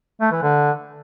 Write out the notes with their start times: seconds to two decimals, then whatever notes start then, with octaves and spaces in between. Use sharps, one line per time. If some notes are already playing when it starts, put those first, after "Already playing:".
0.21 A3
0.32 E3
0.43 D3